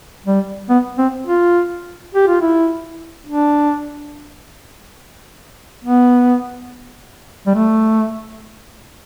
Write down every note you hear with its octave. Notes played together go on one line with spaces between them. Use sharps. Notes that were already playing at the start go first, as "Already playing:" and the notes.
G3
B3
C4
F4
G4
F4
E4
D4
B3
G3
A3